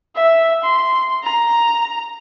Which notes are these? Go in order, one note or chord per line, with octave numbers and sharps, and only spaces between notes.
E5
C6
A#5